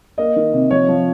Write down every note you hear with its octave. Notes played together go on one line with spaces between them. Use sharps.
A#3 D#5
D#3
C3
F3 C#5
F3